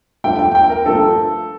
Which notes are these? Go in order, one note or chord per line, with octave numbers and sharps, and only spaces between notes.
G2 F3 A3 G5
G5
G5
A#4
G2 F3 A3 A4